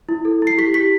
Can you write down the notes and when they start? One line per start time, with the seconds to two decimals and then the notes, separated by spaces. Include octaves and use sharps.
0.09 E4
0.25 A4
0.42 E4 C7
0.58 G4 B6
0.74 G4 B6